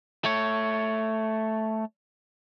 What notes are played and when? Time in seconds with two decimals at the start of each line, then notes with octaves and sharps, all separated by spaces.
0.24 A3 C#5